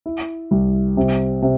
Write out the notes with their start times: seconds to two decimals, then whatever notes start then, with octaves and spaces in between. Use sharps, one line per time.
0.06 E4
0.51 C2
0.97 C3
1.42 C3